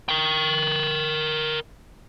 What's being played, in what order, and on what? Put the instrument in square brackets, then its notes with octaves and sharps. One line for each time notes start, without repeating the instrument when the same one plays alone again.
[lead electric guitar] A#4 G5